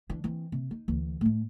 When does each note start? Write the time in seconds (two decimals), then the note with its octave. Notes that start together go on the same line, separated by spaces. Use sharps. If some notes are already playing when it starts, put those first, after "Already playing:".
0.09 E3 D4
0.24 E3 C4
0.52 C3
0.71 D#4
0.88 D2 E3
1.21 A2 A3